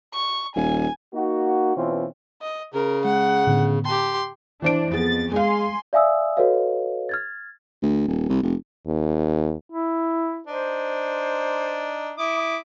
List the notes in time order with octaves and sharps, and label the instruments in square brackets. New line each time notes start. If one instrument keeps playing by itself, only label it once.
[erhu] C#6
[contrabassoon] D#1 [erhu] G#5
[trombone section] A#3 D#4 F#4
B2 E3 C4 C#4 F4
[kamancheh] D#5
[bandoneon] C#3 [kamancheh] A#4
[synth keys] G#3 [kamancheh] F#5
[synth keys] A2 D3 B3
[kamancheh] G4 C6 [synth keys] G5 A5 A#5
[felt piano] E3 C5 D7 [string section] D4
[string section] F2 A6 [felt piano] B3 G#4
[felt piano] G#3 F5 [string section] G#5 C6
[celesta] D5 E5 F5 G#5 D#6 E6
F#4 A4 B4 C#5 D#5 F5
F6 G#6 A6
[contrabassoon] D2
D#1
C2
F1
[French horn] D#2
[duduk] E4
[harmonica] D4 D#4 [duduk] C5
[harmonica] E4 D6 D#6